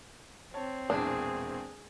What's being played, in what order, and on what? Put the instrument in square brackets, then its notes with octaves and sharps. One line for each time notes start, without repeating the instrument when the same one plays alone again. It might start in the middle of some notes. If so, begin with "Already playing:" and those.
[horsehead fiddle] C4 [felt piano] C#5 A5
[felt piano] E1 A#1 E2 [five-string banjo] D4 [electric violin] G#4